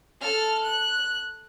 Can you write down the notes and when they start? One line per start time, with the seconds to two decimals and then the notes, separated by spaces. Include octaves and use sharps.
0.21 A4 F6
0.64 F#6